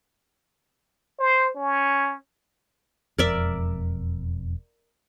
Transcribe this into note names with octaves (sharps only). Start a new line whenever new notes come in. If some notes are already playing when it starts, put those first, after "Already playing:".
C5
C#4
E1 F2 A#4 D5 E5